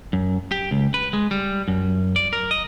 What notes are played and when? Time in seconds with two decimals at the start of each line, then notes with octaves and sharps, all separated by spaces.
0.13 F#2
0.52 G4
0.71 C#2
0.94 B4
1.13 G#3
1.31 G3
1.68 F#2
2.16 D5
2.33 A#4
2.51 D#5